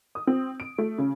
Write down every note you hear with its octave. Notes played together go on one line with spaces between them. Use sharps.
D#6
C4
D7
A3
C#3